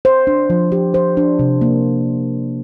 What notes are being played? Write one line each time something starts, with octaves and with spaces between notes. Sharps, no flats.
C5
D4
F3
G4
C5
D4
C3
A#3